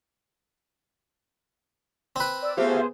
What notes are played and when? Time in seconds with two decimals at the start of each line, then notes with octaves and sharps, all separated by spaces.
2.16 C4 B4
2.42 D5 E6
2.57 A3 B3 F4 G4 G#4 C5